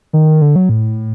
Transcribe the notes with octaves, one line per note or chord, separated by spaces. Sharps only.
D#3
D3
F#3
A2